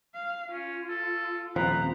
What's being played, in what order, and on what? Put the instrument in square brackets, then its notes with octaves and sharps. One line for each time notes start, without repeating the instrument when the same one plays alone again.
[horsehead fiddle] F5
[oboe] C#4 [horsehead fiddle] F4
[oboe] A4
[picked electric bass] D#1 F3 [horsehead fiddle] C4 A#5 [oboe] B4